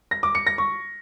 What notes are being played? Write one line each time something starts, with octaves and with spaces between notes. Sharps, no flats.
A#6
D6
C#7
A#6
C#6